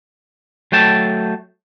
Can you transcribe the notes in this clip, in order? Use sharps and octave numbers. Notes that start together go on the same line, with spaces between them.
F#3 A3 G5 A5